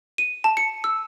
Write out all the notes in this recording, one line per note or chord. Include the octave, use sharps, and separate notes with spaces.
D#7
A5
C#7
E6